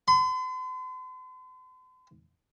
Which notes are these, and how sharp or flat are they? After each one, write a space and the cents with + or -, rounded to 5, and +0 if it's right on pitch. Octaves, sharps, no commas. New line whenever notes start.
C6 -45